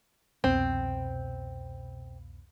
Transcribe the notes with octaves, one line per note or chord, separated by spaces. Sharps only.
C2 F2 B2 C4